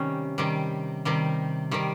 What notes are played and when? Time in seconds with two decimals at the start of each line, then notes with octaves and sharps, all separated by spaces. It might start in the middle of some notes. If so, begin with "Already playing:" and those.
Already playing: C3 D#3 G3 C#4
0.38 C3 D#3 G3
1.05 C3 D#3 G3
1.71 C3 D#3 G3